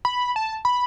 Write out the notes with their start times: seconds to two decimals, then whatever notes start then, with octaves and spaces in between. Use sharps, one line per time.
0.05 B5
0.36 A5
0.65 B5